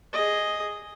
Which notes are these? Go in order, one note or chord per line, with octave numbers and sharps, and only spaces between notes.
G#4 D#5